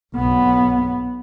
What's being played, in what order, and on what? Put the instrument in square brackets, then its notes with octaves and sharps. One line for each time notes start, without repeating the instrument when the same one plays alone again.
[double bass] B1 B3